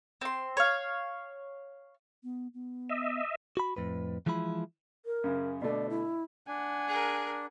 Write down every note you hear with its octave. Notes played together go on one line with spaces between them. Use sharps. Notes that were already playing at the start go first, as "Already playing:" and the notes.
C4 C6
C#5 F5
B3
B3
D#5 E5
F#4 B5
F2 A2 B4
E3 F3 G#3 E4 B5
A#4
F#2 C#3
B2 D3 A3 D5
E4
D4 F#5 G#5
G#4 A#4